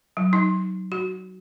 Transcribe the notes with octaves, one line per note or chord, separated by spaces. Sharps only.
F#3
D#4
F#4